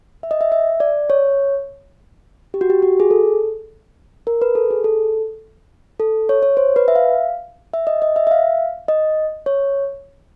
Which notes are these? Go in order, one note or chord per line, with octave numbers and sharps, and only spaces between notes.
E5
D#5
E5
E5
D5
C#5
G4
F#4
G4
F#4
G#4
A4
A#4
B4
A4
G#4
A4
A4
C#5
C#5
C5
B4
E5
F5
E5
D#5
D#5
E5
E5
F5
D#5
C#5